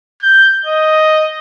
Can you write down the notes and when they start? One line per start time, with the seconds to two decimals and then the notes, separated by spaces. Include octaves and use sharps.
0.22 G6
0.66 D#5